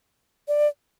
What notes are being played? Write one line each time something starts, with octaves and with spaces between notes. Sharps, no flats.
D5